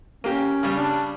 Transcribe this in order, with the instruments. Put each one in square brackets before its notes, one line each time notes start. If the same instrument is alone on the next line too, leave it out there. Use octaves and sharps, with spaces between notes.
[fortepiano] A#3 G4 [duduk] C#4
[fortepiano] C#3 G3
[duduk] D4